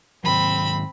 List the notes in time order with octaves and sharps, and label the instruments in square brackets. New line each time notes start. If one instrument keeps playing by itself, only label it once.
[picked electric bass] G#2 D#3 F#3 [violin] C4 B5